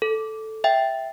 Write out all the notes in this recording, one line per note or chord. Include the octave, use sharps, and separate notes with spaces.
A4
E5 G5